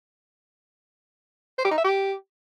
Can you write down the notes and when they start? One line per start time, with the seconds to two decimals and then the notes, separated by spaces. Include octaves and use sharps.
1.58 C5
1.65 G4
1.71 D#4
1.78 E5
1.84 G4